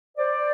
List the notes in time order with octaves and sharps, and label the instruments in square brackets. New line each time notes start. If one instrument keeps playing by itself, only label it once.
[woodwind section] C5 D5